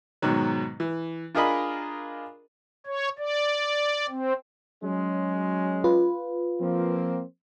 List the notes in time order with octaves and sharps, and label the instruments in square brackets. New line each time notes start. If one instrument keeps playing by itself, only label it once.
[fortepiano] G#2 B2 D#3 F#3
E3
D4 F4 G#4 A#4 D#5 B5
[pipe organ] C#5
D5
C4
[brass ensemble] F#3 G#3 C#4
[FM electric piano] F4 B4
[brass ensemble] F3 A#3 C4